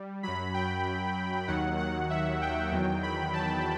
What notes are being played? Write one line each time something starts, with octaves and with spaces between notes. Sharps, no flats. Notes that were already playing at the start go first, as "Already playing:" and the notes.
Already playing: G3
F#2 F#3 B5
G5
D#2 D#3 F#3 F#5
F#5
E5
G5
E2 D#3 F#3
B5
A5